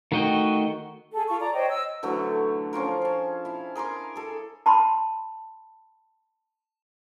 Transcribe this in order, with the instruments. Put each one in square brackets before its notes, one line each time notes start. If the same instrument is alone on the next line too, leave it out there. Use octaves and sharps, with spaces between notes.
[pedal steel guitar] D#3 A3 F#4 D#5 G5
[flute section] G#4 A4
F4 A4 C#6
D5 A#5
C5 C#5 D#5 G5
D#5 E6
[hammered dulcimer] D3 E3 F#3 A3
F3 C#4 F4 A#4
G#4 A5
E4 F5
G#4 A#4 C6 D6
G#4 A4
[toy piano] A5 B5 C6